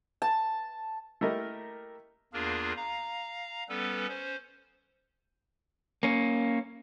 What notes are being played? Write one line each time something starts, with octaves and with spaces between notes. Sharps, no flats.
A5
A3 A#3 E4 G4 A#4 D#5
E2 A#3 D4 F4 G#4 A#4
F5 A#5
G3 B3 C#4 A4 B4
C#4 C5
A#3 C#4